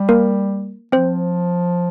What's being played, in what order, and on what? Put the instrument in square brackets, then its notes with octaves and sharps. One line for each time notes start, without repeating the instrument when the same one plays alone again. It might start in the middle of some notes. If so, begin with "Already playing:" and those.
Already playing: [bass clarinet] G3
[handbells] A#3 A#4
[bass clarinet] F3 [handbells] C4 C5